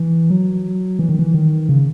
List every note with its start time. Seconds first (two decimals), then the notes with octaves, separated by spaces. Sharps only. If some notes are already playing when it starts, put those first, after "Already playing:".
Already playing: E3
0.30 F#3
0.99 E3
1.09 D#3
1.19 E3
1.34 D#3
1.69 C#3